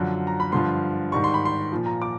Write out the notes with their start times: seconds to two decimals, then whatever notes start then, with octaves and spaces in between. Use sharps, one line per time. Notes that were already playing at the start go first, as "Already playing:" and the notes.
Already playing: F#2 D3 F3
0.27 A#5
0.40 B5
0.52 G2 D3 F3 C6
1.12 G#2 D#3 G3 C#6
1.24 C6
1.34 B5
1.45 C6
1.72 A#2 F3
1.86 A#5
2.02 D6